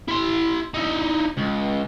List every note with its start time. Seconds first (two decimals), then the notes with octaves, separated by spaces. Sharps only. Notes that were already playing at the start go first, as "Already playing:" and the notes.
0.08 E4 C6
0.74 D#4 E4
1.37 C#2